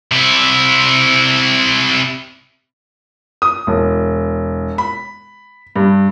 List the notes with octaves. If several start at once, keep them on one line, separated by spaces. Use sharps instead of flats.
C3 E4
D#6
E1
B5
G2